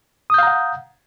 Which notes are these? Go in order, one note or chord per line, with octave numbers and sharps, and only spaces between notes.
F5 F#5 A#5 D#6 G6